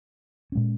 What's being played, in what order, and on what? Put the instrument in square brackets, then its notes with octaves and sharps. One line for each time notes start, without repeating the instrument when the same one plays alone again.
[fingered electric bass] A#2 G#3 C#4